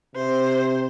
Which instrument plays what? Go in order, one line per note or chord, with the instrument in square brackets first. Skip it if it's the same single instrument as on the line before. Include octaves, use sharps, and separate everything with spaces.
[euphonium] C3 [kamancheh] C5